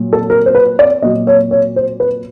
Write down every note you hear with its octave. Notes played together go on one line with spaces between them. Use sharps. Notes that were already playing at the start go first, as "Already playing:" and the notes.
Already playing: A#2 F#3
A4
A#4
C5
B4
D5
A#2 F#3 D#5
C#5
C#5
C5
B4